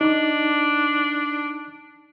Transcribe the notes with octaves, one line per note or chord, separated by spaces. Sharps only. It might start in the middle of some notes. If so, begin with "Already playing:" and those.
D4 D#4 D6